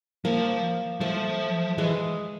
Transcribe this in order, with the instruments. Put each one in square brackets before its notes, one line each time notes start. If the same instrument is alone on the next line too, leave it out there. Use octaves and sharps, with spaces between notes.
[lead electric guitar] F3 [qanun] A#3
[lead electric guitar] F3 [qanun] A3
[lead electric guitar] E3 [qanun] G#3